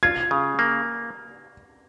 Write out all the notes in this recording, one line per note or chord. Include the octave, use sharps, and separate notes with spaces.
F4 G#6
C#3
A#3